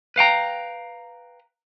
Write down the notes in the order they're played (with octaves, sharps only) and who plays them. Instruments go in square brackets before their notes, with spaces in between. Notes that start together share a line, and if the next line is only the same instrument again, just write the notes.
[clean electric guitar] B4 F5 G5 A#5